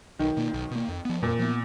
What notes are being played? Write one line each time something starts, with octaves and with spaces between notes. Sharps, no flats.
B1 D#3
B2 A#3
B1
B2 A#3
F2
F3 B3
F2 A#2
F3 B3